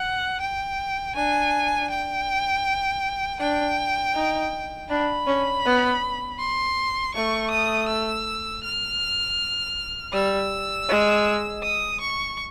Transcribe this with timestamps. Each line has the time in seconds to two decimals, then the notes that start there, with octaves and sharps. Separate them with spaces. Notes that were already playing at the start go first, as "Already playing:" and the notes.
Already playing: F#5
0.41 G5
1.15 D4 G#5
1.90 G5
3.40 D4 G5
4.16 D#4
4.90 D4 B5
5.27 C#4
5.65 B3
6.39 C6
7.15 A3 C#6
7.51 D#6
7.88 E6
8.64 F6
10.13 G3 E6
10.89 G#3
11.63 D#6
12.00 C#6